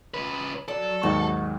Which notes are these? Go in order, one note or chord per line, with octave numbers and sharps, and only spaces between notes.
C#3 B4
F#3 A4 D5
D#2 G#2 F#4